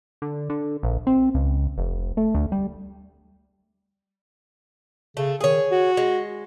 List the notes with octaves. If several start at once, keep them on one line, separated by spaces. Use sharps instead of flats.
D3
D3
A#1
C4
C#2
F1
A3
D2
G3
C#3 A3
D#3 G#4 C#5
F#4
G#3